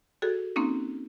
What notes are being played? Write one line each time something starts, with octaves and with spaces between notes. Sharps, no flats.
F#4 G#4 A4
A#3 C4 C#4 D#4